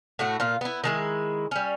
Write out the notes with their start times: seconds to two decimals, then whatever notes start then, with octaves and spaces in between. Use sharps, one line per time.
0.19 A2 A3 F#4
0.40 A#2 F4
0.61 B3 E4
0.84 D#3 G#3 E4
1.51 G3 C#4